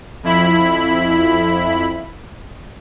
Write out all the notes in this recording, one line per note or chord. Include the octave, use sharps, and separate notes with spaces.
F2 E4 B5